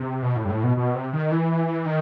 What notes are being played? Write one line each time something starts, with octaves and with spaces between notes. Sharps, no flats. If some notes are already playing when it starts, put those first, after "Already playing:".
Already playing: C3
B2
A2
G2
A2
B2
B2
C3
D#3
E3
D#3